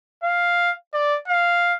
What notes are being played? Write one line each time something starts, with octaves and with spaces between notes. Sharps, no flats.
F5
D5
F5